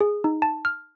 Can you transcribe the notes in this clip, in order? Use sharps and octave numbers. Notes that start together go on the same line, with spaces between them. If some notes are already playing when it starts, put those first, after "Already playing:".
G#4
D#4
A5
F6